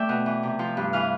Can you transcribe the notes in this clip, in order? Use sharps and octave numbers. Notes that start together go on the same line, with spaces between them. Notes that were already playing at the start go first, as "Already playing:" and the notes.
Already playing: A3 D5 E5 G5 A5
B2
E3
C3
F3
G2
E3 F5